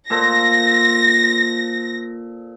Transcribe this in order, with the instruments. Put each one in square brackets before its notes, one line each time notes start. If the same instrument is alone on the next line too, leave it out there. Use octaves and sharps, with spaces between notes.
[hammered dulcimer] A#2 A4 C5 [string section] A#6